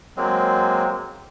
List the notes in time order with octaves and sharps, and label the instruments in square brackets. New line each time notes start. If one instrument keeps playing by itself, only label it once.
[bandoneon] F#3 G#3 A#3 C4